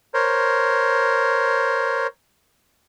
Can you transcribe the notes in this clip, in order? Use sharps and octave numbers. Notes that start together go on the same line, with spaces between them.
A#4 C5 C#5